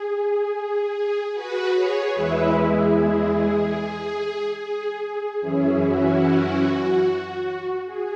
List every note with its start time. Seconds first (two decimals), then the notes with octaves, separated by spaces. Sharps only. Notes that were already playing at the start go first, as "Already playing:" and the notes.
Already playing: G#4
1.34 F#4 B4
1.74 G#4 C#5
2.15 E2 E3 G#3 E4 B4 E5
2.55 G#4
2.97 G#4
4.60 G#4
5.00 G#4
5.40 F#2 E3 C#4 E4 G#4
5.82 F#4
7.86 G#4